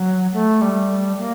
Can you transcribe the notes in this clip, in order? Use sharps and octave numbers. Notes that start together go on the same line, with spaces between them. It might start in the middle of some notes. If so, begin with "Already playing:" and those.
Already playing: F#3
A3
G3
A#3